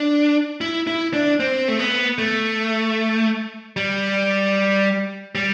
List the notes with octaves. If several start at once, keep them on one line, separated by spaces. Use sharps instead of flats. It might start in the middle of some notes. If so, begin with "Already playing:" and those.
Already playing: D4
E4
E4
D4
C4
A3
B3
A3
G3
G3